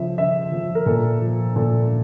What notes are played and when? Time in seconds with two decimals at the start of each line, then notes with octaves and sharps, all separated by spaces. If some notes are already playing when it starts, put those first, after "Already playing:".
Already playing: C#3 F3 E5
0.18 C#3 E5
0.52 F3
0.75 A#4
0.86 A#2 A4
1.22 F3
1.56 A#2 A4